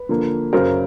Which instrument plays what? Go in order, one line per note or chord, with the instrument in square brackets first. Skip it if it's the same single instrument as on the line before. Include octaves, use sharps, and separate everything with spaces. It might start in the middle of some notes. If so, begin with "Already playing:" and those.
Already playing: [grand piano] B4
D3 F3 A#3
F#2 C#3 F#3 A#4 C5